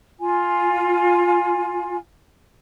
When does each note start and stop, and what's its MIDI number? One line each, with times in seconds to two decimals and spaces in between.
0.20 1.97 65
0.20 1.97 80